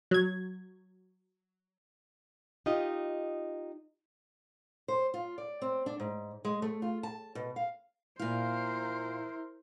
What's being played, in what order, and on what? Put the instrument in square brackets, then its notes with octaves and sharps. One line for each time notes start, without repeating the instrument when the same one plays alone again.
[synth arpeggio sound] F#3 G#6
[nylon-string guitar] D#4 F4 G4 D#5
[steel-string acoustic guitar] C5
F4
D5
C4
D4
G#2
G#3
A3
F4
A5
B2
F5
[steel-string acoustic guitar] A#2 F5 [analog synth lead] E4 [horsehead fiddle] A#4 C5